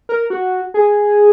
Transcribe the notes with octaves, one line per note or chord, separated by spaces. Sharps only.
A#4
F#4
G#4